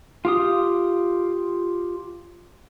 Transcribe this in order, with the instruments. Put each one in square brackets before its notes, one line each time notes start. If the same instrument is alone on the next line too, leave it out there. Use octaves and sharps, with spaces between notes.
[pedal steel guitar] F4 G4 D#6